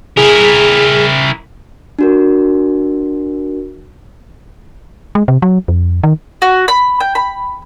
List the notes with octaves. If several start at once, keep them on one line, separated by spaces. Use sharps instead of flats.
E4 G#4 A#4
D4 F#4 A#4
G#3
C3
F#3
F2
D#3
F#4
B5
G5
B5